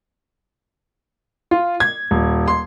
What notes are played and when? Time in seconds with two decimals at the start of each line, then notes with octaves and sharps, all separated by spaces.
1.51 F4
1.80 G#6
2.11 D#1
2.48 C6